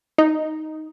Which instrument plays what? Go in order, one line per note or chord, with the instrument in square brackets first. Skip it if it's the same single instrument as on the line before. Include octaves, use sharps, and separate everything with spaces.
[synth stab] D#4